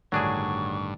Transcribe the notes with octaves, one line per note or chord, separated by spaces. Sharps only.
A1 G2 D3 D#3 F#3 D4 G#4 C#6